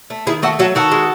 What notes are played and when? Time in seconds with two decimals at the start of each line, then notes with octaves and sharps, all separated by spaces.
0.10 A3
0.27 D#3 E4 G#4
0.42 A3 F#4 A4
0.59 F#3 F#4 A4
0.75 D#3 F#4 A4
0.91 G#3